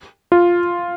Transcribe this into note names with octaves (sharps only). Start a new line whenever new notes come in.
F4